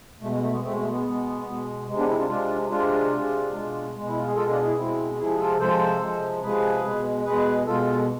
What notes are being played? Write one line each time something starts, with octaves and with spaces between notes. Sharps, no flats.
B2 G#3 A3
G#3
A3
G#3 B3
B2 G#3 A3 C4
A3
G#3 B3
B2 G#3
B2 G#3
C3 G#3
B3 D4
C4 E4
D4 F4
C3 G#3 D4 F4
C3 G#3 D4 F4
C3 G#3
G#3
B2
B2 G#3
E4
F4
G#4
B2 G#3 F4 A4
D4 F4
E4 G#4
B2 G#3 C4 E4
C3 F3 G#3 E4 G#4
F4 A4
C3 F3 G#3 A4 C5
C3 F3 G#3
C3 F3 G#3 G#4 B4
B2 G#3
B2 G#3 G#4 B4
B2 G#3 F4 A4